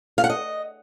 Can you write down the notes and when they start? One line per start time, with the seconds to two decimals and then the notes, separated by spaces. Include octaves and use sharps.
0.18 F5
0.24 F#5
0.30 D#5